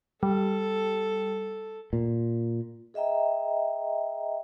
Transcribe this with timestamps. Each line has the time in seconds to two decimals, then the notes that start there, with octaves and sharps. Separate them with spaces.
0.23 G3 A4
1.93 A#2
2.94 G#4 D#5 E5 G5 A#5